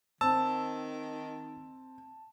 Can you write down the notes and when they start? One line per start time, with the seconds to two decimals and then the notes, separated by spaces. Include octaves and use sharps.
0.21 D#3 C4 A5 E6